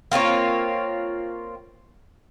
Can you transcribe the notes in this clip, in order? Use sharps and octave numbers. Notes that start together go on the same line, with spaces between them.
A#3 C4 F4 C#5